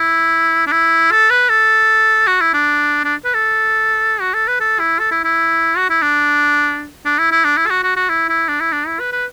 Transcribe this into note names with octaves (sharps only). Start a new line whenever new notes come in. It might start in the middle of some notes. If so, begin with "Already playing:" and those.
Already playing: E4
D4
E4
A4
B4
A4
F#4
E4
D4
D4
B4
A4
F#4
A4
B4
A4
E4
A4
E4
E4
F#4
E4
D4
D4
E4
E4
D4
E4
A4
F#4
F#4
F#4
E4
E4
D4
E4
D4
E4
B4
B4